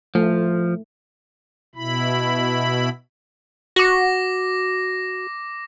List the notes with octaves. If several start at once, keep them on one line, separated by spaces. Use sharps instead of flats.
F3 A3
B2 E4 B5
F#4 D6 A#6